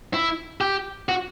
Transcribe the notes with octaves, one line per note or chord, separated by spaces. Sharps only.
E4
G4
F#4